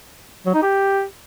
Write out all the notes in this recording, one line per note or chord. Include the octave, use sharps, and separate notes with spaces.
F#3
D#4
G4